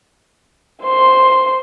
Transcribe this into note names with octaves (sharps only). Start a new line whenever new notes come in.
C5 C6